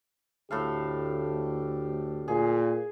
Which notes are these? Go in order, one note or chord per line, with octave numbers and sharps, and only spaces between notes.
D2 A2 G4 A4 F5
A#2 G#4